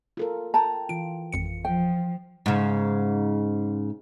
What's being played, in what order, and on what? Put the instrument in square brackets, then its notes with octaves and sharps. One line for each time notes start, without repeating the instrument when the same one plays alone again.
[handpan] F4 A4 A#4
[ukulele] G5 A5 A#5
[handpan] E3 F4 [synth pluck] D7
[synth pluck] G#1 F2 C#7
[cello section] F3 [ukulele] G5
[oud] G#2 C#3